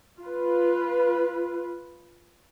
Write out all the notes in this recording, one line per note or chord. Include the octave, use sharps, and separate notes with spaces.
F4 B4